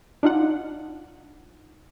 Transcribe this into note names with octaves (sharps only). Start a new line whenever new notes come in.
D4 D#4 F4 F#5